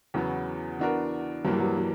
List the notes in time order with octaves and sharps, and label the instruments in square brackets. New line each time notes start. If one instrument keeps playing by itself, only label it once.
[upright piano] E2 C#3 F#3 B3
E3 B3 D4 F#4 A#4
[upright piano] G2 E3 A#3 [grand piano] F#3
[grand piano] G3
F#3
F#3